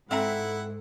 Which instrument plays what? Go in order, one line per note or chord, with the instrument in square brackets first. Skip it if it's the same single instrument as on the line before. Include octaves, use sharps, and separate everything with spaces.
[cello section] G#2 [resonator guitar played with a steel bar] C4 E5 A#5 [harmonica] E4 F#5 [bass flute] A4